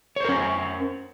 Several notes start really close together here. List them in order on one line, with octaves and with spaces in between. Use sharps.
C#5 C5 A#4 C#4